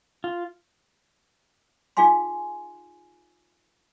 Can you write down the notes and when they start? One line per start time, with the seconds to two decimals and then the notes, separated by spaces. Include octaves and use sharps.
0.24 F4
1.97 D#4 F4 G#4 F5 G#5 C6